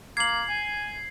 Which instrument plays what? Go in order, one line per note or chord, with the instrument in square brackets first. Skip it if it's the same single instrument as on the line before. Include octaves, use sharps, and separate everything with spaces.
[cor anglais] A#3 [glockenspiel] G#6 F#7 [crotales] C7
[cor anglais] G#5